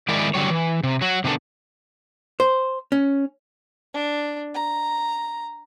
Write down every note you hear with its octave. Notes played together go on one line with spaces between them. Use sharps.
D#3 G#3 E4 A#4 D5
D3 F#3 G3 C#5
E3
C3
F#3 F#4
C3 D#3 B3 D4 A4
C5
C#4
D4
A#5